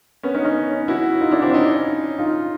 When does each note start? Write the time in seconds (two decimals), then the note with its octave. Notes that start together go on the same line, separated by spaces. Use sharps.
0.23 B3 C#4
0.35 C#4 D#4
0.45 C#4 D#4
0.88 E4 F#4
1.21 D#4 F4
1.31 D4 E4
1.42 C4 D4
1.54 C#4 D#4
2.19 D#4 F4